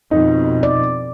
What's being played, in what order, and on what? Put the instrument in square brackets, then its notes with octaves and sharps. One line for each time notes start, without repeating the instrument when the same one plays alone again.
[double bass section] F2 B2 [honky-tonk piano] D#4
[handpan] D5